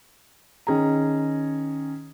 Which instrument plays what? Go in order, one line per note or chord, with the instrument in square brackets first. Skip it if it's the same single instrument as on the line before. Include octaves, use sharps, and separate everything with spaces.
[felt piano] D#3 C#4 G#4 A#5